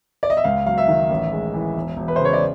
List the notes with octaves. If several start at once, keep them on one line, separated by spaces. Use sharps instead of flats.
D5
D#5
E5
C#2 F5
F#3 F5
E5
D#3
A1
G#3
E3
E1
E1
B4
C#3 C5
C#5
D5